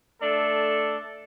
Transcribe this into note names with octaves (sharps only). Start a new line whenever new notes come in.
A3 D4 A4